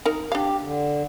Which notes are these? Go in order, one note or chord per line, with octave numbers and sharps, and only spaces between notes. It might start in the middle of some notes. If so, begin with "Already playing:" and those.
D#4 A#4
D4 G4 F5
D3